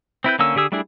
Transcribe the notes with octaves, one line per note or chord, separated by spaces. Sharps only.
C4 E4 B4 G6
D3 A#3 C#4 E6
D3 G4 G#4 E6
G3 A3 D4 E4 G#4